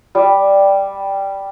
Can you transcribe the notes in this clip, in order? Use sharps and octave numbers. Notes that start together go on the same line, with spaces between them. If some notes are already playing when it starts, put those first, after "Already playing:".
G3